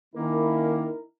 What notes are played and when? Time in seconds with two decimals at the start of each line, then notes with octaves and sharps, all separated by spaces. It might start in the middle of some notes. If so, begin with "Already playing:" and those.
0.15 D#3 A#3 C#4 D#4 E4 A#4